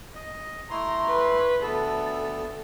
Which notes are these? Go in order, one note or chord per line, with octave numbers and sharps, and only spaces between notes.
D#5
A3 E4 A#5 C6
B4
D2 B3 A4